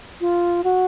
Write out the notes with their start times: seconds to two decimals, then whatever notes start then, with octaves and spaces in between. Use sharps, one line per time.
0.21 F4
0.64 F#4